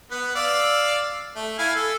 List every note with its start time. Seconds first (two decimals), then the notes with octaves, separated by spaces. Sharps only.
0.11 B3 B4
0.35 D5 F5 E6
1.35 A3
1.59 E4 F5 G#5
1.75 A4